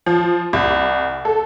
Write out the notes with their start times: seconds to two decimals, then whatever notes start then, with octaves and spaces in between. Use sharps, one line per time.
0.06 F3
0.53 C2
1.25 A4